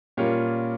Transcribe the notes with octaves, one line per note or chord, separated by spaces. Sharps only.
A#2 G3 C#4 F4 A#4